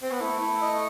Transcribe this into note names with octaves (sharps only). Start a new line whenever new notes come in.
C4
B3
A3 E4
E4
D#5